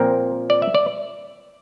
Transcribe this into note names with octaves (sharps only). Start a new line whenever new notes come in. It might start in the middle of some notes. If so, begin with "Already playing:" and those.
Already playing: A#2 F3 C4 A#4
D5
E5
D5